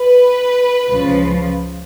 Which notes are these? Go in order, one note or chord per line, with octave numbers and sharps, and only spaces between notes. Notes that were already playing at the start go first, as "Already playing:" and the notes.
Already playing: B4
C#2 C#3 F3